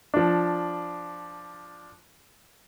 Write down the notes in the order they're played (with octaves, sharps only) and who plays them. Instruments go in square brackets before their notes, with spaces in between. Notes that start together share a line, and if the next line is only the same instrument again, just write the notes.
[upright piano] F3 D4